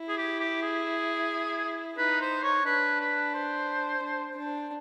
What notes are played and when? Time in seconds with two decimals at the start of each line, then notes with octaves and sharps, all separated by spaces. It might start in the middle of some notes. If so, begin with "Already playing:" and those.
Already playing: E4
0.09 G#4
0.17 G4
0.39 G4
0.62 G#4
1.97 D#4 B4
2.21 C5
2.43 C#5
2.66 D4 B4
3.01 B4
3.34 C5
4.02 D4
4.37 D4